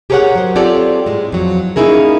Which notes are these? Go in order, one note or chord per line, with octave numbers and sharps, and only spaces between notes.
G4 G#4 A#4 B4 C#5 F#5
F#3 C5
C4 F4 G4 A4 C#5 D5
A2 G#3
F2 F#3
A#3 C#4 D#4 E4 G#4 A#4